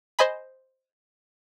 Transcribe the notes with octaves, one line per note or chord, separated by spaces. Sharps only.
C5 D#5 G#5 B5